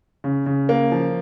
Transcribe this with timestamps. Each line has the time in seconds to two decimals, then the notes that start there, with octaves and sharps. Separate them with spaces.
0.24 C#3
0.46 C#3
0.69 A#3
0.92 F3